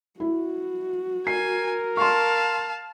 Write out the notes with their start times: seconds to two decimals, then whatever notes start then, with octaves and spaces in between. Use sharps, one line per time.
0.20 E4 F#4
1.27 A#4 G#5 C7
1.97 F5 A5 C6 C#6